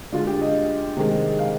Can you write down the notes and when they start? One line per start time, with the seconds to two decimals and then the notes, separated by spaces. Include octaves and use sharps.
0.12 D3 G#3 F4
0.27 G4
0.41 D#5
0.96 C3 D#3 G#3
1.39 F5